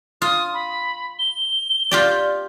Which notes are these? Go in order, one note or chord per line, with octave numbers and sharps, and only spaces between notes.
F4 D#6
B5
G7
F4 G4 D5